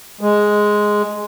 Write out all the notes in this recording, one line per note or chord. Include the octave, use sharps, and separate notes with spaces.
G#3